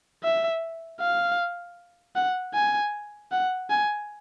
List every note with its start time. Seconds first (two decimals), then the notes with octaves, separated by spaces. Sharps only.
0.24 E5
1.00 F5
2.16 F#5
2.54 G#5
3.32 F#5
3.70 G#5